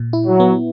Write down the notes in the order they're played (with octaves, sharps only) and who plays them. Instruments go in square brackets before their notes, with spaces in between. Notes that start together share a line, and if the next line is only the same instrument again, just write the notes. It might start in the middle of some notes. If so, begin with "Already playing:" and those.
Already playing: [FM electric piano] A#2
E4
[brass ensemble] F#3
[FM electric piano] B3